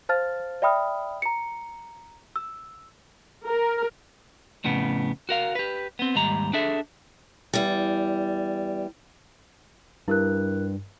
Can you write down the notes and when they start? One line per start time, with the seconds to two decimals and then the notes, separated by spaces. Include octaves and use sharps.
0.09 C5 F5 A5 F6 A6
0.62 D5 E5 G5 B5 D#6 F6
1.22 A#5 C#7
2.36 E6
3.45 A#4
4.64 F2 A2 C#3 B3
5.29 F#4 A#4 F5
5.55 G4 B4
5.99 B3 C4
6.15 D#2 G#2 G3 A#5
6.53 D4 G#4 A4 E5
7.53 E2 G3
10.08 G2 E4 A#4 F#6